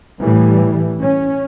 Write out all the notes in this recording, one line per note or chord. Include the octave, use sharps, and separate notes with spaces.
A2 E3 G3
C#4